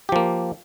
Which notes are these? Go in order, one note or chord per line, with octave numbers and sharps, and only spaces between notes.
F3 A#3 G4